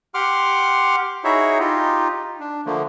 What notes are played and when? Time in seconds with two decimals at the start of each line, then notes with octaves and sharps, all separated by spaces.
0.14 G4 F#5 C6 D6 F6
1.24 D#4 E4 F#4 G#4 C#5 E5
1.60 D#4 F4 G4
2.40 D4
2.66 D3 F3 A3 A#3